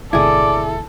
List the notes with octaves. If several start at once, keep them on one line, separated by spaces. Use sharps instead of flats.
G#1 B2 D3 E4 G#4 A4 D5